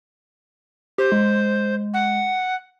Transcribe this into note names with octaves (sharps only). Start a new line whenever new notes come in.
G4 C5
G#3
F#5